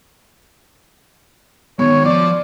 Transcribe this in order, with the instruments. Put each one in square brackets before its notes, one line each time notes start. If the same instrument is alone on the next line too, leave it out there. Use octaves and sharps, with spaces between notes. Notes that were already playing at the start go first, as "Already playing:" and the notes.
[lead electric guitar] D#3 G#3 [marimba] B3 [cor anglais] C#5
[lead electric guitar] F3 [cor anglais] D5